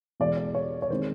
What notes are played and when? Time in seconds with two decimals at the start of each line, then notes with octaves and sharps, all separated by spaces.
0.20 E2 B2 G#3 D5
0.37 D5
0.55 C#5
0.82 C#5
0.90 D#3 G#3 C4 C5